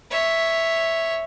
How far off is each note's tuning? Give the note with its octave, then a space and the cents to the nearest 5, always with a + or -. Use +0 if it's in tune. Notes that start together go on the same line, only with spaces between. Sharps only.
C#5 +0 E5 +0